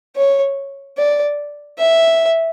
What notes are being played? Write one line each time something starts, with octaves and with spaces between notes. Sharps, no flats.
C#5
D5
E5